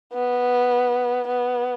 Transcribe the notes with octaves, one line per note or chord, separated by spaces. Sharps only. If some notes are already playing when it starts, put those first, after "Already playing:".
B3
B3